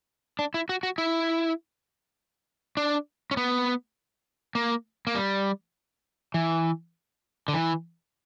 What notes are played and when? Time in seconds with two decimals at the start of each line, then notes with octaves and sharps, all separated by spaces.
0.39 D4
0.54 E4
0.69 F#4
0.83 F#4
0.98 E4
2.77 D4
3.31 C#4
3.37 B3
4.55 A#3
5.07 A#3
5.15 G3
6.34 E3
7.48 D3
7.54 E3